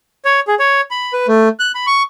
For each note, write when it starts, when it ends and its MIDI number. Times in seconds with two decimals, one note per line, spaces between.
0.25 0.40 73
0.48 0.55 68
0.59 0.81 73
0.91 1.13 83
1.13 1.27 71
1.28 1.48 57
1.60 1.72 90
1.75 1.86 83
1.87 2.03 85